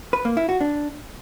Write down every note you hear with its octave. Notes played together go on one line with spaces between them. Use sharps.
B4
A#3
E4
F#4
D4